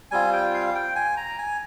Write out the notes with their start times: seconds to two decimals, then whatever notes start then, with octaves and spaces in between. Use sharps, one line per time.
0.11 G3 C4 F4 G#5
0.33 G5
0.54 F5
0.75 G5
0.96 G#5
1.17 A#5
1.38 G#5